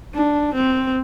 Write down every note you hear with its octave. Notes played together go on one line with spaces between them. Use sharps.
D4
C4